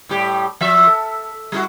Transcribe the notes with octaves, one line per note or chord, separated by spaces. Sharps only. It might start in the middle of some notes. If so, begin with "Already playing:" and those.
A2 G3 G4
F3 E5
A4
G3 E4 F#4